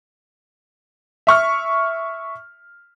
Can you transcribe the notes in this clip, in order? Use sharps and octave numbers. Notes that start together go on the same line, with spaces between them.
E5 C#6 F6